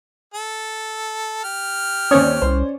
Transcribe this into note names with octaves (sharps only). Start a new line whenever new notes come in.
A4
G4 F6
D#2 C4 C#4 C#5 D5 D#6
C2 C5